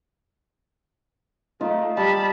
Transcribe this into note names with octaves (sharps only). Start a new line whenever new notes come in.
A3 D#4 F4
G3 A5 B5